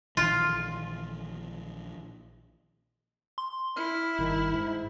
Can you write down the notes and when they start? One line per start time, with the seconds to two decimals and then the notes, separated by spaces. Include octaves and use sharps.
0.17 A#1 D#3 E3 F4
3.38 C6
3.77 E4 F6
4.19 G1 D#3
4.54 G#2